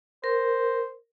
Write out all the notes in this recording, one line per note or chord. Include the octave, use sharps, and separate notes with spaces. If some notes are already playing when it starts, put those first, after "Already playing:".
A#4 C5